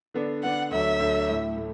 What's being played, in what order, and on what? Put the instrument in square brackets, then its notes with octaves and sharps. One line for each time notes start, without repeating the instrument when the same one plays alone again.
[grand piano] D3 B3 D4
[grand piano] D3 B3 D4 [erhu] F#5
[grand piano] D2 D3 F#3 [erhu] E5
[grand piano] D2 D3 F#3
A2 A3 E4
A2 A3